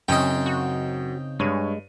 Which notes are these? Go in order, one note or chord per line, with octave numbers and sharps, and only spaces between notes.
F#2 C#3 C4 C#4 D#4 D#5 G5
F#4
G2 G#3 C#5 D#7